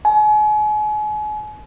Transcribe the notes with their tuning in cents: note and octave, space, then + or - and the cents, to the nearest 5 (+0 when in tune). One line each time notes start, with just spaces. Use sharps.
G#5 +35